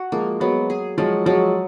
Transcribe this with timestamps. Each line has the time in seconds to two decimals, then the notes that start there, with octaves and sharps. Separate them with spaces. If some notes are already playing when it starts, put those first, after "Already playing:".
Already playing: F#4
0.12 F3 G#3 A#3
0.40 F#3 G#3 B3
0.70 G#4
0.98 F3 F#3 G#3
1.26 F3 F#3 G#3